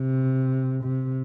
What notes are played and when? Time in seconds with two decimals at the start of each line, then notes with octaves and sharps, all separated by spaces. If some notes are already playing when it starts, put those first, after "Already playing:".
Already playing: C3
0.84 C3